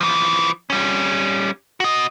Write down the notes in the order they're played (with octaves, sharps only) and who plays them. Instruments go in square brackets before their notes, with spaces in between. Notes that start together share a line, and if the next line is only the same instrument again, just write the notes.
[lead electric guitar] E3 F3
G3 C#4
F#4 D#5